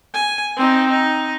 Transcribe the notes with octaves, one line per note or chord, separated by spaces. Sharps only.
G#5
C4 D#4
D#4